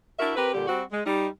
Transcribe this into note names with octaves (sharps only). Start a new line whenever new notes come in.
D4 E4 F#4 A#4 E5
C4 G4 A#4 B4
A#2 D3 G3 G4
G3 C4 F#4
G#3
G3 D#4